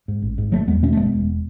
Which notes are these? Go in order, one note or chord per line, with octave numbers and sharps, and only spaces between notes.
G#2
A1
G#2
F#1 F#3 A3
E2 G#3 B3
B2 A3 C#4
A3
F#1 G#3 B3
E1